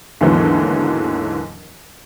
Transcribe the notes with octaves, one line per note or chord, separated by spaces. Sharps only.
D#2 G#2 D3 E3 F#3 B3